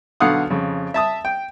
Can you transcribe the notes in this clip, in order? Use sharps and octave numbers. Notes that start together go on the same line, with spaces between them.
B1 D3 F5 F#5 D#6
F2 C#3
E5 A5 D#6
G5